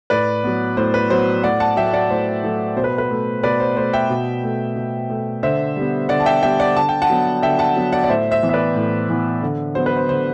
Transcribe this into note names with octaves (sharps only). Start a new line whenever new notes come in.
A2 B4 D5
F#3 B3
A2 C5
B4
F#3 B3 C5
A2 D5 F#5
F#5 A5
F#3 A3 E5 G5
D5 F#5
A2 C5
F#3 A3
B2 C5
B4
B4
A3
B2 B4 D5
C5
A3 C5
E5 G5
B2
A3
B2
A3
D3 C5 E5
G3 B3
D3 D5 F#5
A5
E5 G5
G3 B3 E5 G5
D5 F#5
D3 A5
G5
F#5 A5
F#3 B3
D3 E5 G5
F#5 A5
F#3 B3
D5 F#5
D5
A2 C5 E5
C5 E5
E3 B3
E5
B4 D5
A2
E3 B3
D3
F#3 B3 C5
B4
C5
D3 C5